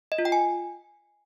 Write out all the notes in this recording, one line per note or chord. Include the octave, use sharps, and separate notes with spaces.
D#5
F4
G5
G#5